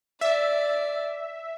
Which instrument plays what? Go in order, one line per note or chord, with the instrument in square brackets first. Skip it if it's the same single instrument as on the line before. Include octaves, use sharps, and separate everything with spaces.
[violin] D5 [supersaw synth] E5